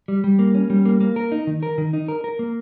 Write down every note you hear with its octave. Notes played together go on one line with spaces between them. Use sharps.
G3
G3
A#3
C#4
G3
A#3
A#3
A#4
D#4
D#3
A#4
D#3
D#4
A#4
A#4
A#3